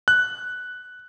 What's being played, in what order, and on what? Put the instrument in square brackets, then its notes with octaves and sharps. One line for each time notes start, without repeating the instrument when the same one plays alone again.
[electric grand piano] F#6